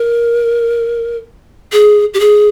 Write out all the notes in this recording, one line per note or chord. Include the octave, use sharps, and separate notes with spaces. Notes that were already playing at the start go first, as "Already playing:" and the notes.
Already playing: A#4
G#4
G4
G#4